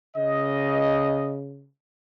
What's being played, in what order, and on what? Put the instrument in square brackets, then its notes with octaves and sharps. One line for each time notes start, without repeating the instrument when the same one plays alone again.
[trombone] C#3 [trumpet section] D#5